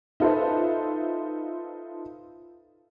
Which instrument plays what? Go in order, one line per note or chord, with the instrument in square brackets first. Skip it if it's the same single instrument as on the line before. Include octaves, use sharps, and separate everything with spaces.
[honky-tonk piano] D#4 F4 A4 B4 C5 E5